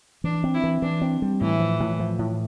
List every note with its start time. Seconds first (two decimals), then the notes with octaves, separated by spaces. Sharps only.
0.24 E3 D4
0.44 C4
0.54 E4
0.64 E3
0.82 E3 D4
1.02 C4
1.22 G3
1.41 A2 E3
1.60 F3
1.80 A2
1.99 F3
2.19 A2